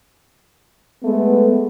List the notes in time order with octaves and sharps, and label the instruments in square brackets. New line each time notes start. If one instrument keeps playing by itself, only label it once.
[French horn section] G#3 A3 B3